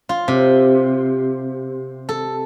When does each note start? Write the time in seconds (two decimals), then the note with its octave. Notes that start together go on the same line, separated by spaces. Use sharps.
0.09 F4
0.28 C3
2.09 A4